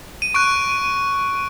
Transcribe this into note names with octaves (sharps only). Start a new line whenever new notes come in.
D#7
C#6 F#6 D7